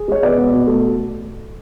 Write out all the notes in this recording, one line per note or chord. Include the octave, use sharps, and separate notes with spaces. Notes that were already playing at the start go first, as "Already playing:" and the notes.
Already playing: G#4
G#3 C#5
B2 B4 D5
B3
B2
A3